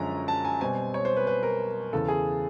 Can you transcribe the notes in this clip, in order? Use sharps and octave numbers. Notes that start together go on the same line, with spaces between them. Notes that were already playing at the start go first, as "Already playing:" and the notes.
Already playing: F#2 D3 F3 G#3 C#4 A#5
A5
G#5
B2 G3 C4 G#5
C#5
C5
B4
B4
A#4
E2 C#3 E3 A4
G#4